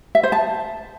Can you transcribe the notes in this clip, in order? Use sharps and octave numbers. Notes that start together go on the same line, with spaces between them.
E5
C5
A5